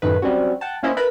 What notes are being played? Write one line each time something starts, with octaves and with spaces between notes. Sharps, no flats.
F#2 A2 D#3 B4
F#3 G3 C4 C#4 F#4
F#5 G5 A5
A#3 C#4 E4 C5 D#5 E5
E4 A#4 B4 A5 B5